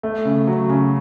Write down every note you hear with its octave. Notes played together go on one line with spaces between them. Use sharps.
A3
C#3
F#3
C#3